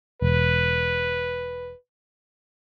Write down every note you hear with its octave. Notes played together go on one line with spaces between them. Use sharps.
E1 B4